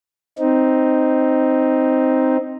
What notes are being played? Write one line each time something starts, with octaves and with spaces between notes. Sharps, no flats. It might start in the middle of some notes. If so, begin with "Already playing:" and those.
C4 D#4